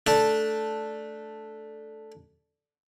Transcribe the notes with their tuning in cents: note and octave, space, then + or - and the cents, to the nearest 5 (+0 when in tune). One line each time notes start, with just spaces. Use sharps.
A3 +0 D4 +0 A5 +0